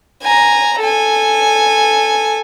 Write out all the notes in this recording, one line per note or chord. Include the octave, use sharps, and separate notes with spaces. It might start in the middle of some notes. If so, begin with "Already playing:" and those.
G#5 A#5
A4 G#5